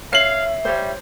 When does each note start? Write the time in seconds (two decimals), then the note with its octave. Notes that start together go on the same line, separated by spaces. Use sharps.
0.13 C#5 E5 F5 C7 F#7
0.65 G3 C5 C#5